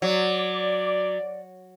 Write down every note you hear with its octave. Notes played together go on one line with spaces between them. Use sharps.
F#3 D5